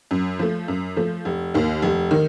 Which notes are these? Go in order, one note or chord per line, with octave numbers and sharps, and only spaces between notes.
F#2
F3 A3
F#2
F3 A3
F1
D#2 D#3
F1
D#3